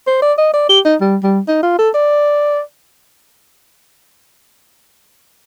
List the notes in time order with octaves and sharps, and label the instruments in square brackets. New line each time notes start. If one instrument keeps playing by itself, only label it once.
[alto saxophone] C5
D5
D#5
D5
G4
D#4
G3
G3
D#4
F4
A4
D5